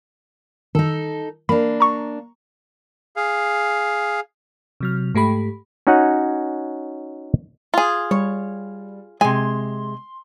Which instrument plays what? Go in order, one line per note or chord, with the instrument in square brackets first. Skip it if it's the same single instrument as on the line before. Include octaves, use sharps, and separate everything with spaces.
[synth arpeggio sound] D#3 [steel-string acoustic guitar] D#4 A4
[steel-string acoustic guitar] A#3 D4 [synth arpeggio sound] B5
[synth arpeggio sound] A#5 C#6
[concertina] G#4 F5
[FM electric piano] C3 F#3 F6
G#2 A3 G4 B5
[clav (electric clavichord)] C#4 D#4 F#4 C#5 F#5 G#5
[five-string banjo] F4 G#4
[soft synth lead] G3 [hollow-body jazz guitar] C#5
[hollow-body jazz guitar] C3 G#3 [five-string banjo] G#5 [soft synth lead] C6